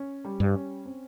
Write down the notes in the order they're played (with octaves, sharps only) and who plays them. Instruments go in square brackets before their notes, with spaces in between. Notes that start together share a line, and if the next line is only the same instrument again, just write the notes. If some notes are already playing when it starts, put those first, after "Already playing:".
Already playing: [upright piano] C#4
G3
[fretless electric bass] G2
[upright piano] C#4
C4